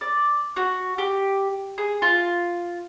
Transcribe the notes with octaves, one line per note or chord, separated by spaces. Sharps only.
D5
F#4
G4
G#4
F4